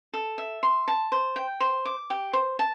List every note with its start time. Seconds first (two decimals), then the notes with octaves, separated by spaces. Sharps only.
0.14 A4
0.38 E5
0.63 C6
0.88 A5
1.12 C5
1.36 G5
1.60 C5
1.85 D6
2.10 G4
2.33 C5
2.59 A5